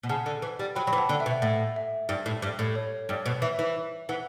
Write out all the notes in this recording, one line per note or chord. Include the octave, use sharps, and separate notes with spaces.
B2
C#3 F#5 A5
D3
E3
G3
F#3 G5 B5
F#3 G5 B5
E3
F#5 A5
D3 F#5
E5
B2
E5
A2 F#5
E5
G2
A2
G2
A2
C#5
G2
B2
E3 E5
E3
E3 F#5